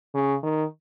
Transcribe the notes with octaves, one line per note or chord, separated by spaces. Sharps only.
C#3
D#3